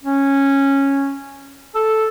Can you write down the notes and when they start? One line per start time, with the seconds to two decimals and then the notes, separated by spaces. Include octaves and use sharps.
0.03 C#4
1.75 A4